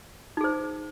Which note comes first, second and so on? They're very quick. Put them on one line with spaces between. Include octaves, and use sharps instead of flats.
D#4 G#4 C5